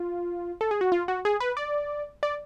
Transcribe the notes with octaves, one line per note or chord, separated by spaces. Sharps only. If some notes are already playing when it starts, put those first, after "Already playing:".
Already playing: F4
A4
G#4
F#4
F4
F#4
G#4
B4
D5
D5